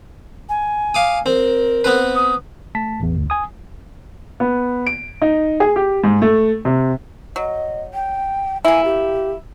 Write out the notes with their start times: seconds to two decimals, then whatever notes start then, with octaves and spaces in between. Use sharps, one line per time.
0.49 G#5
0.94 F5 D6 D#6
1.26 C4 A#4
1.84 B3 C4 B4
2.15 D#6
2.75 A3 A5 B6
3.00 A1 E2
3.15 G1 D2
3.30 G#5 D#6
4.40 B3
4.87 D7
5.22 D#4
5.60 G#4
5.76 G4
6.04 G#2
6.22 A3
6.65 C3
7.36 F#3 D#5
7.94 G5
8.65 A#3 E4 G#5
8.85 G4